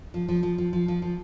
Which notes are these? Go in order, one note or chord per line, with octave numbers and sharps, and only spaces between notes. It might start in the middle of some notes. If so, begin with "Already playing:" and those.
F3
F3
F3
F3
F3
F3
F3